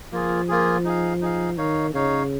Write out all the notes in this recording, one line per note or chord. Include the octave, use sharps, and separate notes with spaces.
F3 A#3 F4 G#4
A#3 F4 G#4
D#4 G#4 F5
D#4 G#4 F5
D#3 D#4 C#5 F5
C#3 D#4 C#5 F5